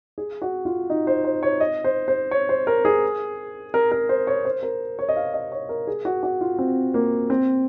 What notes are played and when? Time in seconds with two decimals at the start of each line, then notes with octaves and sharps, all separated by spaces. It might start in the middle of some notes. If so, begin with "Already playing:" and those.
0.18 G#4
0.42 F#4
0.65 F4
0.90 D#4
1.07 C5
1.25 C5
1.43 C#5
1.60 D#5
1.84 C5
2.08 C5
2.31 C#5
2.49 C5
2.67 A#4
2.85 G#4
3.74 A#4
3.92 A#4
4.09 C5
4.27 C#5
4.45 C5
4.63 A#4
4.99 C#5
5.09 D#5
5.16 F5
5.34 D#5
5.52 C#5
5.69 A#4
5.87 G#4
6.05 F#4
6.23 F#4
6.41 F4
6.59 C4
6.94 A#3
7.30 C4